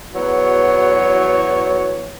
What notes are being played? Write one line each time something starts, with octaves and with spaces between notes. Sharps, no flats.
E2 F#3 F#4 C#5